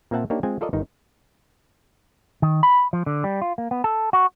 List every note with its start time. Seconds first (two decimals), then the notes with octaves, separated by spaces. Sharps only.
0.11 A#2 A#3 C4 E5 F#5 A5
0.30 A#3 D4 D#4 G4 C#5
0.43 G#3 C4 F4 D#5 G#5
0.61 F4 A4 A#4 D5 D#5
0.73 G1 D#3 D#4
2.42 D#3
2.63 B5
2.93 F3
3.06 D3
3.24 G3
3.42 F4
3.58 A#3
3.71 B3
3.84 A4
4.13 F#4